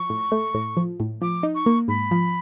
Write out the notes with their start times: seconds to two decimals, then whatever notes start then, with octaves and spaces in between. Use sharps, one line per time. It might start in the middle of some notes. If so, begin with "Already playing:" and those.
Already playing: F3 C#6
0.10 A2
0.32 A3
0.55 A2
0.77 F3
1.00 A2
1.21 F3 D6
1.43 D#4
1.55 C#6
1.66 A#3
1.88 G#2 B5
2.11 F3